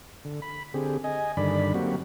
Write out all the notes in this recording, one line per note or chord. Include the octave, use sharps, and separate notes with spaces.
D3
B5
D3 C4 G4 G#4
D#5 G#5
G2 D3 D#3 D5 B5
F#3 A#3 C4 F#4 G4